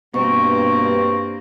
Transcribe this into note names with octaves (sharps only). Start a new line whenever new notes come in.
G2 B2 A#3 C4 C#6